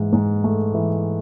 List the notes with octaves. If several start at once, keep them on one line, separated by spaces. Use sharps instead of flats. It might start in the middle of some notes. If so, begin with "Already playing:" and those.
Already playing: G#2 E3
G#2
A3
E3